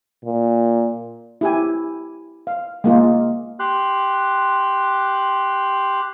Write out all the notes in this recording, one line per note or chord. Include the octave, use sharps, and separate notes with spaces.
A#2
E4 G4 G#5
F5
G#3 A#3 F4
G4 C6 F#6